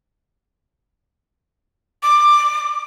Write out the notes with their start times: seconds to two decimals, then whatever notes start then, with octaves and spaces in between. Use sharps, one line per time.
2.03 D6